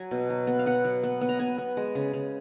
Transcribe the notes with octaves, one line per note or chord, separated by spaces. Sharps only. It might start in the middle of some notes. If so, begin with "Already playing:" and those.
Already playing: F#3 G#5
B2
F#3
B3
F5
B3 F#5
F#3
B3
B3
A#5
B3 G#5
B3
G#3
C#3
C#3